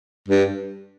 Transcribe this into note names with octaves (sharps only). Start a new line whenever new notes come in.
G2